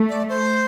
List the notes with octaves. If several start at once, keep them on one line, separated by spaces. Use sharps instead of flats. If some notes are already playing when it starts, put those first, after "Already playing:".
Already playing: A3
D5
C5